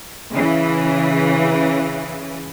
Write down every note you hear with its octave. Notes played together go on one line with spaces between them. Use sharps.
C#3 E3